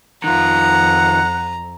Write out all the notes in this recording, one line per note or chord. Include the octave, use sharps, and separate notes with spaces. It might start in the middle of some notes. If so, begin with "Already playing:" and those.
F2 D#3 F4 F#5 A#5